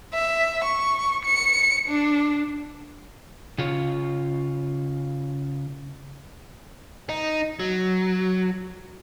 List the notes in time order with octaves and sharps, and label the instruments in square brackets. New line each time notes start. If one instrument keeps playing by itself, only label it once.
[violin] E5
C#6
C#7
D4
[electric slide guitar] C#3 F4 C#5
[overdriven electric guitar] D#4
F#3